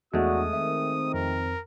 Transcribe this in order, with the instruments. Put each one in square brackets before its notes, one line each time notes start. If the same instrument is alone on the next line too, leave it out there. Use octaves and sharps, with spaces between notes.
[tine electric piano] E2 [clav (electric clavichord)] G#3 A3 [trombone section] D4 F#4 [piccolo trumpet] D#6
[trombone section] D#3 C4 [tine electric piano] E5
[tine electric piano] F2 [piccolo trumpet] A#4